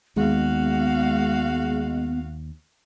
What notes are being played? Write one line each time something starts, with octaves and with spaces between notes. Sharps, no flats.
D#2 G#3 B3 F#4 F5